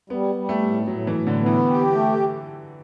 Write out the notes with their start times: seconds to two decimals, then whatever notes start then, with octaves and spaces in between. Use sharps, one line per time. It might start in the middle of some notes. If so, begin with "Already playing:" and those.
0.10 G3 B3
0.35 G3
0.49 A3
0.62 A2
0.87 A2 F#3
1.07 E3
1.14 A2
1.27 D3
1.40 B3
1.46 E3
1.66 G4
1.92 A3